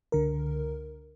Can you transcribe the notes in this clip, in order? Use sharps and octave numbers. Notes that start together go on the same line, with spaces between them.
C#2 D3 A#4